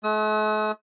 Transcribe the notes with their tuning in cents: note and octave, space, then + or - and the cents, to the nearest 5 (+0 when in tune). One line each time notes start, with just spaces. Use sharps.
A3 -45 D#6 +45